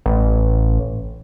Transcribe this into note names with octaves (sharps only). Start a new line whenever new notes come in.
A1